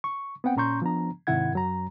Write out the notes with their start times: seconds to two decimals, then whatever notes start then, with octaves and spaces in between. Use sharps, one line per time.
0.04 C#6
0.44 B3 C4 F#5 G5
0.57 A#2 C#4 A#5 C6 C#6 G6
0.82 F3 B3 D4 A#5
1.27 G#2 C3 D#3 E4 F#5 G#6
1.53 F#2 F#3 A#5